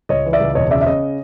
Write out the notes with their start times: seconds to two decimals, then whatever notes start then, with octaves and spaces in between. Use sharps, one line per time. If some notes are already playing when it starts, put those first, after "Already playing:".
0.09 C#2 C#5 D#5
0.26 E3
0.33 D5 E5
0.41 C#2
0.55 E1 C#5 D#5
0.71 C#3 D5 E5
0.81 E5
0.86 C#3 C#5 D#5